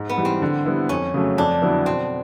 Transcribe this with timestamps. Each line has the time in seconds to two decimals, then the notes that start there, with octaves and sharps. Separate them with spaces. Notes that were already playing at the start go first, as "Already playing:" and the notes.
Already playing: G#2
0.09 B3
0.18 E3 G3
0.25 C4
0.42 D3
0.65 G3 B3 E4
0.89 F2 C#4
1.14 C#3 F#3 A3
1.38 F2 D4
1.62 D3 F#3 B3 E4
1.86 B2 C4